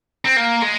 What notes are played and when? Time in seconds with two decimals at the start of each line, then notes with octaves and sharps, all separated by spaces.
0.25 C4
0.36 A#3
0.62 G#3